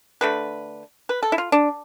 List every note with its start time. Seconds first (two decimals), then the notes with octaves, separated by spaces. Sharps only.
0.21 D3 A3 B4
1.09 B4
1.23 A4
1.32 E4
1.38 F4
1.52 D4